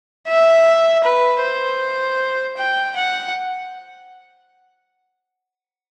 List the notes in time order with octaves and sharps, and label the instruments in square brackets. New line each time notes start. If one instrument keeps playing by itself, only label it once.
[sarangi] E5
B4
C5
G5
F#5